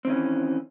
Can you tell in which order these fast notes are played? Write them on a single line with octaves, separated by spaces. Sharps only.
C4 D#3 C#4 E3